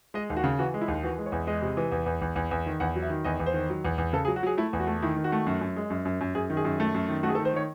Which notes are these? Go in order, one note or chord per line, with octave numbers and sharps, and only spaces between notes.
G#3 D#5
D#2
F#4
C#3
E3 F#4
G#3
E4
D#2
E3 F#4
G#3
C#5
E2
G#3 D#5
C3
E3
E2
E2
E2
E2
E2
D#3
E2 F#5
F#3
E5
D#3
E2 D#5
E2
C5
D#3
F#3
E2
E2
C#3 A4
G#4
F#3
F#4
F#3 G#4
A3 E4
E2
F#4
A3
D#3 E4
D#3
F#4
A3
F#2
F#2
G#3
F#2
F#2
F#2
F#2 G#4
D#3
G#4
F#2
A3
F#2
D#3
A3 F#4
G#4
A4
D#3
C5
D#3 C#5